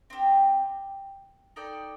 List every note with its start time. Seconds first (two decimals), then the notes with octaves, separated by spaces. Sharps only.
0.10 C4 D#4 G4
1.56 D#4 A4 D5 G5